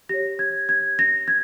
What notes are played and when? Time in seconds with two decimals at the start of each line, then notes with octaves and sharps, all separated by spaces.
0.09 G4 C#5 A#6
0.39 G#6
0.69 G#6
0.99 A#6
1.28 G#6